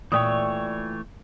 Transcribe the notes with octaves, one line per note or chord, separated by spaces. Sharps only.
A#2 E3 A3 C#5 D5 G5 D#6